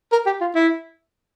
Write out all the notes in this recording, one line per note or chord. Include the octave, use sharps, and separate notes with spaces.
A#4
G4
F4
E4